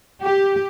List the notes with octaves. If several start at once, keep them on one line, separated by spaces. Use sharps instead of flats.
G4